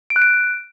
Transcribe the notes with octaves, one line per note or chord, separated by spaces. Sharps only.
D7
F#6
D7